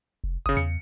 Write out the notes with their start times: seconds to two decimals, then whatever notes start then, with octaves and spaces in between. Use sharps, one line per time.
0.24 F1
0.46 G1 C#3 D#6
0.57 E2 C#7